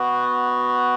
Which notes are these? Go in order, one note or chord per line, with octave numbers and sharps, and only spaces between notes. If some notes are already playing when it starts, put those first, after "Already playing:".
Already playing: B3 F#4